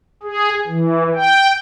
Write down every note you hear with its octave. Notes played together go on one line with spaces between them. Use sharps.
G#4
E3
G5